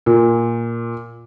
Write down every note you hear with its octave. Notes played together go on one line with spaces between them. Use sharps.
A#2